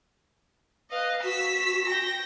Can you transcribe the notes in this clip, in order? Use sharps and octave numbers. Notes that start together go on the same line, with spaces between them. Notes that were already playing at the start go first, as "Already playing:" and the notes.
B4 D#5 F5
F#4 E6 B6
G5 A#6